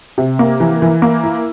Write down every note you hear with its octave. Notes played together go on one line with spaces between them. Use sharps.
C3
A#3
E3
E3
A#3
E4